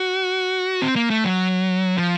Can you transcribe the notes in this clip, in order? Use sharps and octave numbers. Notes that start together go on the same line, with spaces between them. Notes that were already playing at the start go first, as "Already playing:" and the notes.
Already playing: F#4
C4
A#3
A3
F#3
F3